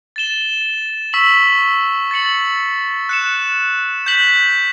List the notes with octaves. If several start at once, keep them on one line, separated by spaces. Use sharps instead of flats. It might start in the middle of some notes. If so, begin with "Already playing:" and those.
A6 E7 G7
C#6 E6 B6 F#7
A6 C#7 F#7
F#6 C#7 E7
G6 B6 F#7